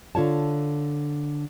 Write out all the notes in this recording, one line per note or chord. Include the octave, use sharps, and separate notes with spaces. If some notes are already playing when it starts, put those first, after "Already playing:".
D3 F4 C#5 A5